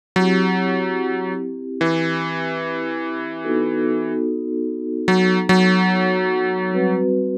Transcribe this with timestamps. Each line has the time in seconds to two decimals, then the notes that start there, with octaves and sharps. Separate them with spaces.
0.16 F#3 C4 E4 G4
1.81 E3
3.45 B3 D#4 F#4 A4
5.08 F#3
5.49 F#3
6.73 G3 C4 F#4 B4